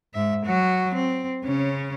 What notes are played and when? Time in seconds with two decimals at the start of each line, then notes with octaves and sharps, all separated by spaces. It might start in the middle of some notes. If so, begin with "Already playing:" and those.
0.14 G#2 E5
0.45 F#3 F#4
0.95 C4
1.45 C#3 C#4